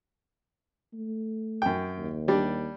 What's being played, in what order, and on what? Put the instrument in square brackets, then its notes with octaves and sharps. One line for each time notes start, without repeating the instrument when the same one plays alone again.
[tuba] A3
[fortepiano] F#2 G5
[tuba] D#2
[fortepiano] G3 D4